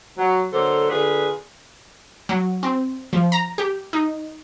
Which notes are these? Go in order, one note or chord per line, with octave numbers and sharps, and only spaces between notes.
F#3
D3 F#3 A#3 A4 C5
D3 F4 G#4 B4
F#3
C4
F3
A#5
G4
D#4